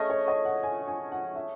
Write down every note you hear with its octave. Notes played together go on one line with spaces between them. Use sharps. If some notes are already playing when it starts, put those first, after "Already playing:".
Already playing: A3 C#4 G#4 D#5
C#5
D#5
F#5
G#5
G#5
F#5
E5